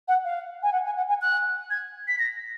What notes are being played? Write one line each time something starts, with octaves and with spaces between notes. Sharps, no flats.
F#5
F5
G#5
F#5
G#5
F#5
G#5
F#6
G#6
B6
A#6